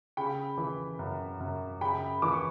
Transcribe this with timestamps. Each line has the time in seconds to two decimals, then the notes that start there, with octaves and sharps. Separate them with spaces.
0.17 C#3 G5 B5
0.58 E3
0.99 F#2
1.40 F#2
1.81 C#3 G5 B5
2.22 E3 D6
2.33 C#6